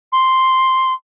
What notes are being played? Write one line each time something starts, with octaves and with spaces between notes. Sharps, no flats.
C6